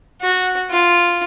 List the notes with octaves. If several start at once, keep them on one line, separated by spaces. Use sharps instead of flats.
F#4
F4